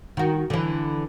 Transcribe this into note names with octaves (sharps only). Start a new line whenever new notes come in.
D#3 F#4
D3 E3